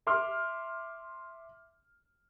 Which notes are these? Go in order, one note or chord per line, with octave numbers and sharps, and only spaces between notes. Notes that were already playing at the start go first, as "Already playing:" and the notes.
E5 C6 D6 F6